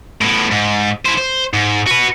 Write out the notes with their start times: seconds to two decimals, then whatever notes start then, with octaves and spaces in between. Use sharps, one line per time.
0.22 A2 B3
0.52 G#2
1.06 E4 C5
1.18 C5
1.54 G#2
1.87 F#4 B4